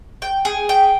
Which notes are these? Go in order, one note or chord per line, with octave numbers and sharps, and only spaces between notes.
G5
G#4
G5